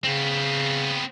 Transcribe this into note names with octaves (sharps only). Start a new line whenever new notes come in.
C#3 B3 C4